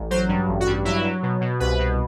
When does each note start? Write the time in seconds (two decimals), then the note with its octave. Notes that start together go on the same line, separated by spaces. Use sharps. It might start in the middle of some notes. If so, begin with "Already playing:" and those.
Already playing: A1
0.10 F#3 C5
0.28 G2
0.48 A1
0.60 F#4
0.67 G2
0.85 F#3 E4
1.04 F#3
1.23 B2
1.41 B2
1.60 C2 B4
1.79 B2